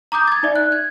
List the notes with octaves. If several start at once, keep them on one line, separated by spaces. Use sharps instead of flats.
A#5 D6 D#6 G6
G#6 A6
D#4 D5 E5
F#6
G#6